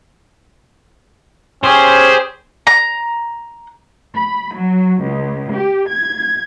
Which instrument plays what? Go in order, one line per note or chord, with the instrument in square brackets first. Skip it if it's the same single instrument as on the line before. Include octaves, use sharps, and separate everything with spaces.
[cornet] C#4 [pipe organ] G4 G#4 [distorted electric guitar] C5
[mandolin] A#5
[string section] B5
F#3
C#2
G4
G#6